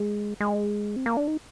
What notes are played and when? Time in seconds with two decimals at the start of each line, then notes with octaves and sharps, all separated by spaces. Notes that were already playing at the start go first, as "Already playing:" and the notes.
Already playing: G#3
0.40 G#3
0.96 C4
1.06 A#3
1.17 D4
1.27 D#4